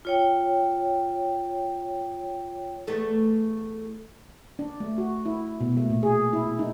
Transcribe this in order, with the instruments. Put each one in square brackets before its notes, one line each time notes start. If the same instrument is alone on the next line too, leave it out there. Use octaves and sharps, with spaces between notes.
[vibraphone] F4 C#5 G5
[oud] E2 A3 A4
[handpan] D4
A3
F#4
E4
B2
A3
A#2
G#4
E4
D#4